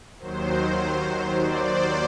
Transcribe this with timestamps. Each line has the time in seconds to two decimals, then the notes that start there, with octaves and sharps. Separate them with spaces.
0.19 D#2 D#3 F#3 C5
1.39 D5
1.69 C5